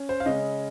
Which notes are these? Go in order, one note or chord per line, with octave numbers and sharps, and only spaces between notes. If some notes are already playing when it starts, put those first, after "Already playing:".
Already playing: C#4
C5
F5
C#3 G#3 C#4 D#5